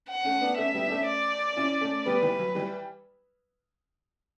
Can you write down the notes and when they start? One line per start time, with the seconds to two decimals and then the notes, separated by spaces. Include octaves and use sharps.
0.09 F#5
0.25 A3 C#4
0.41 B3 D4
0.58 A3 C#4 E5
0.74 G3 B3
0.87 D4
0.91 A3 C#4
1.07 D5
1.56 C#4 E4
1.81 A3 C#4
2.06 G3 B3 B4
2.22 E3 G3
2.39 F#3
2.55 E3 G3